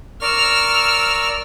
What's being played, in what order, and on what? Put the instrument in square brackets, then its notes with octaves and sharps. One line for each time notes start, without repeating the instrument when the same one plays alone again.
[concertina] A#4 D5 C#6 [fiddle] E6 F6